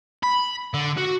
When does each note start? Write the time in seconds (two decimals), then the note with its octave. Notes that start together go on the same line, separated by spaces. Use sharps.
0.23 B5
0.74 D3
0.97 F#4